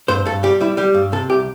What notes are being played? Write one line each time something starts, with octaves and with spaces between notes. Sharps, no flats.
G2 C5
G2 A4
G3 G4
G3 E4
G3 G4
G2
C3 A4
C2 G4